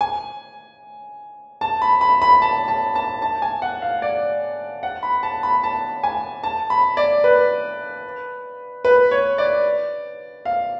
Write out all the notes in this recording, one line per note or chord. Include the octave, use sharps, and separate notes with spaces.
G#5
A5
B5
B5
B5
A5
A5
A5
A5
G#5
F#5
F5
D5
F#5
B5
A5
B5
A5
G#5
A5
B5
D5
B4
B4
C#5
D5
F5